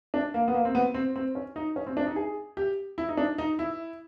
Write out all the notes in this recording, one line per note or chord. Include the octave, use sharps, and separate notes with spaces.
D4
A#3
B3
A#3
C4
B3
C4
C4
C#4
D#4
C#4
C4
D4
D#4
G#4
G4
E4
D#4
D4
D#4
E4